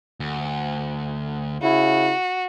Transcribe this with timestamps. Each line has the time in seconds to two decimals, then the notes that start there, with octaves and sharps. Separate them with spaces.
0.20 D2
1.62 C#3 E4 F#4